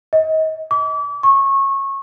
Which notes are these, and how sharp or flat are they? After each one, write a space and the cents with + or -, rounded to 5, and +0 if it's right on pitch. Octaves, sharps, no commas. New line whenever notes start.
D#5 +30
D6 -35
C#6 -20